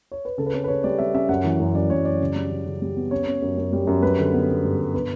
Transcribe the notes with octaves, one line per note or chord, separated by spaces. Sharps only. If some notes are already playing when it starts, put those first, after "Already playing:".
C#5
B4
C#3 A4
B4
C#4 A4
B4
C#3 C#5
G3 D5
G3 E5
C#4 E5
F#2 F#5
E3
F#2
F#2 D5
F#2 C#5
F#2 D5
C#3
G3
C#3
C#3
G3
B3
C#4 C#5
C#4
F#2
F#2
G3
F#2
G3 B4
D3
B3
B3
G2
G2
B2 B4